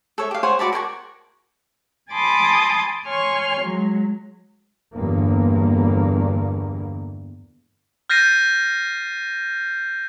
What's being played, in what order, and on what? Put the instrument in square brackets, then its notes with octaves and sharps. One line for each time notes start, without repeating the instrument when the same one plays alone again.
[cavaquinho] A4 C#5 E5
G4 F5
C5 C#5 F#5 G#5
F#4 D5 A5 B5
A#4 F#5 G#5 C#6
[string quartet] G#5 A5 B5 C6 D6 D#6
C#5 G#5 C6 C#6 F6
F#3 G#3
[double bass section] G1 E2 G2 A#3
[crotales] F6 G6 A6 A#6 C7 D#7